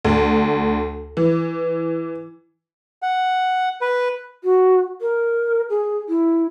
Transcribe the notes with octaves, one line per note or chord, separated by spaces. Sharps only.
D2
E3
F#5
B4
F#4
A#4
G#4
E4